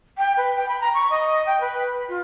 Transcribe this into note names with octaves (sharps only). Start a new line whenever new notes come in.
G5
B4
G5
B5
A#5
C#6
D#5
G5
B4
F4